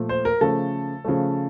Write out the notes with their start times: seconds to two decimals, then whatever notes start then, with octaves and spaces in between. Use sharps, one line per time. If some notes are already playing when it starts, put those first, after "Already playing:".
Already playing: A#2 F3 A3
0.09 C5
0.25 A#4
0.41 C#3 F3 A3 A4
1.05 C#3 F3 A3